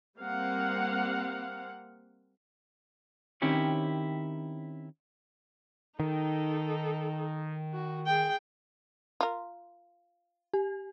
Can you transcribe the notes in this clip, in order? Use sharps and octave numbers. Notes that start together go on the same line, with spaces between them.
G3 A#3 C4 F5 F#5
D#3 C4 C#4 E4 G4 C#5
D#3 D#4 A4
F#4
G#4 G5
F4 A#4
G4